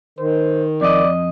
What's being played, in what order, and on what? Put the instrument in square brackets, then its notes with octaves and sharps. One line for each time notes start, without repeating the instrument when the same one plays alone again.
[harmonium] D#3 [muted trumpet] C5
[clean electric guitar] F2 D#5 [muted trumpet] D5